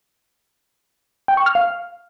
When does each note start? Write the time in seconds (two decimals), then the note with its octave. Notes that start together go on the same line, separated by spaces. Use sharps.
1.28 G5
1.37 C#6
1.46 F6
1.55 F5